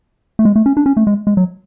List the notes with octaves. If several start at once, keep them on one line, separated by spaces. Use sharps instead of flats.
A3
G#3
A3
C#4
D4
C#4
A3
G#3
G#3
F#3